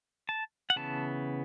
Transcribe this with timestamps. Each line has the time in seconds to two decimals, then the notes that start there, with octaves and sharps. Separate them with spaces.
0.29 A5
0.70 F#5
0.76 C#3 E3 B3 A5